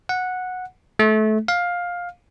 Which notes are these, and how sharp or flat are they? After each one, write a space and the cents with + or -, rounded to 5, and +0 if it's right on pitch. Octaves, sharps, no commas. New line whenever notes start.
F#5 -10
A3 -25
F5 +15